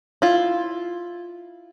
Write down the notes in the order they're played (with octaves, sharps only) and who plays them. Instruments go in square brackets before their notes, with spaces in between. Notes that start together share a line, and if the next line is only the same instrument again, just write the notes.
[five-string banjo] E4 F4